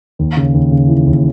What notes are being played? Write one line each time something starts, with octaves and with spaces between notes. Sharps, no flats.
D#2
C#3
D#2
C#3
E3
D#2